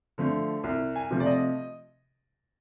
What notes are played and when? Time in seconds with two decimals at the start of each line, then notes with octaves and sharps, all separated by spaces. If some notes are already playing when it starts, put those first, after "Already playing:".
0.18 D3 F3 A3
0.64 C2
0.96 G#5
1.11 C3 F3 A3
1.20 D5
1.26 D#5